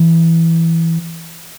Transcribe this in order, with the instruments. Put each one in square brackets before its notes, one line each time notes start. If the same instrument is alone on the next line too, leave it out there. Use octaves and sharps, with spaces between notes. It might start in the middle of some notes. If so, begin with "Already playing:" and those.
Already playing: [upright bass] E3